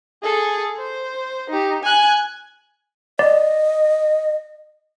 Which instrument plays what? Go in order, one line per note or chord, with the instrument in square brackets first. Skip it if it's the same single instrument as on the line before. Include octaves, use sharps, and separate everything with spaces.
[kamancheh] G#4 A4
C5
D#4 G4
G#5 F#6
[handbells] D5 [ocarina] D#5